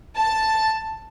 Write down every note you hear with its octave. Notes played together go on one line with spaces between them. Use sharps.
A5